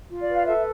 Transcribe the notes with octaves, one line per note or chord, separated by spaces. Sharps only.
F4
D5
B4
F5
A4 E5